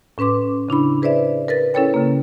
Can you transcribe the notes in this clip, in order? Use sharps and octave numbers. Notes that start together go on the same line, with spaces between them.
A2 C#4 B4 C6 D6
C#3 D4 E4 B5
G#4 B4 C5 D5 E5
A#4 B4 A6
C#4 E4 A4 B4 C#5 G5
C#3 A#3